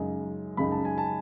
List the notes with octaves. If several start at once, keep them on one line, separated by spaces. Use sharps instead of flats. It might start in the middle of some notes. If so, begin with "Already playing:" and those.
Already playing: F#2 C#3 G#3 D#4
F#2 C#3 G#3 D#4 B5
A5
G#5
A5